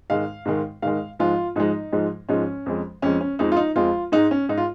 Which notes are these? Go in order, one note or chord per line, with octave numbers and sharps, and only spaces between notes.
G#2 D#3 G#3 F5
G#2 D#3 G#3
G#2 D#3 G#3 F5
G#2 F3 G#3 F4
G#2 F3 G#3 D#4
G#2 F3 G#3
G#2 F3 G#3 C#4
F2 F3 G#3
F2 F3 G#3 C#4
C#4
F2 F3 G#3 D#4
F4
D#4
F2 F3 G#3 F4
G#2 G#3 D#4
C#4
G#2 G#3 D#4
F4